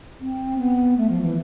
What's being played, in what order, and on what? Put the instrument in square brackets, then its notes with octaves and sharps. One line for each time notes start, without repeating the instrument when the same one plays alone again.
[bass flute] C4
B3
A3
F3
E3